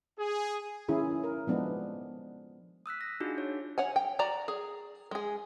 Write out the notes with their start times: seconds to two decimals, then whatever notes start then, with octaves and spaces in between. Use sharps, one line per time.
0.19 G#4
0.88 D#3 C#4 E4 G#4
1.24 A#4
1.47 F3 G#3 B3 D4
2.86 D#6 E6 F#6 B6
3.01 A#6
3.20 D4 D#4 F4 F#4 G#4
3.38 C#5
3.78 C#5 F#5 G#5
3.96 G5
4.19 F#4 D5 A#5
4.48 G#4
5.11 G#3 G#4